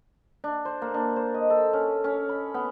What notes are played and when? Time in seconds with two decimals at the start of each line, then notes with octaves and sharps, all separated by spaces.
0.44 D4
0.65 C5
0.82 A#3
0.94 D4
1.16 C5
1.34 D#5
1.50 A4
1.73 C#4
2.04 C#4
2.29 B5
2.54 B3